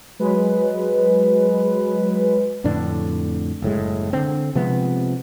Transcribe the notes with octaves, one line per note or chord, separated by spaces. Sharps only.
F#3 G#3 B4
F2 A2 D3 D4
F#1 A2 G#3
D3 C4
C3 F3 G#3 B3